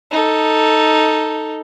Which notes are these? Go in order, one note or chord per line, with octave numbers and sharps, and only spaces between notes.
D#4 A4